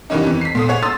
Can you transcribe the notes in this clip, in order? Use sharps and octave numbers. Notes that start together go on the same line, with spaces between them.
G2 D#3 E3 C#4 D#4
F2 E3
B6 C7
A#2 A4 D#6
G#4 C#5 F#5
C6 D#6 E6 A6